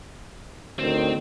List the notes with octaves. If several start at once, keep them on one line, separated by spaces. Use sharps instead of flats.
D2 A2 D#3 C4